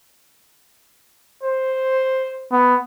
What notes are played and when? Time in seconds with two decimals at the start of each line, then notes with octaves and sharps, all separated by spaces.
1.43 C5
2.52 B3